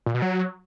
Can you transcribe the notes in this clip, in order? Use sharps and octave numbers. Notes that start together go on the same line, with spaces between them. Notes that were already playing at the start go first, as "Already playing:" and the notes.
A#2
B2
F#3